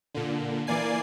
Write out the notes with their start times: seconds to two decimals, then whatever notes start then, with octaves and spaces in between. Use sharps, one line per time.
0.15 A#2 D3
0.67 E3 A#3 D5 G#5 C7